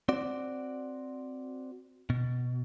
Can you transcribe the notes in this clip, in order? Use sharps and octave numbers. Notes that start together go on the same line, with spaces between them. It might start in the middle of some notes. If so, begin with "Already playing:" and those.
C4 F#4 D5
B2